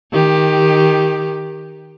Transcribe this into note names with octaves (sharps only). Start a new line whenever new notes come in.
D#3 G4